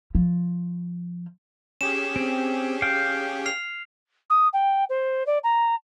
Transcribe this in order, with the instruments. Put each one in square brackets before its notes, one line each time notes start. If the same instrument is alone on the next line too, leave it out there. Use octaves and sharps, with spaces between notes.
[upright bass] F3
[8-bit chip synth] C#4 G4 G#4 [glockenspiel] E7
[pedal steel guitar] C4
F5 G5
[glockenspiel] F6 C7 F7
[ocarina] D#6
G5
C5
D5
A#5